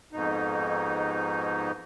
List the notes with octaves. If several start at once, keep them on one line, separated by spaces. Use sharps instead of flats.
F2 G#2 B2 D#4